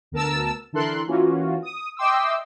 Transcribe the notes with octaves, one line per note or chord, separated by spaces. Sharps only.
D2 B3 A#4 A5 E6
D3 E3 A4 A#4 C6 F#6
E3 A#3 C#4 F4 F#4
D#6
D#5 E5 G5 C6 D6 E6